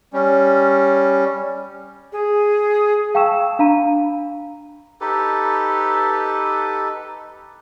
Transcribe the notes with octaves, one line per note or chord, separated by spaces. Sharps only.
G3 C#4
G#4
F5 G5 A5 C#6 E6 E7
D4 F5 A#5 B5 D#7
D#4 G4 A4 B4